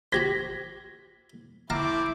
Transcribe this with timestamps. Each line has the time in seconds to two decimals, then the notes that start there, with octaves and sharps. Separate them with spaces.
0.12 F#4 G4 C5 G#6 A#6 B6
1.70 A3 C4 E4 F5 A5 A#5 D6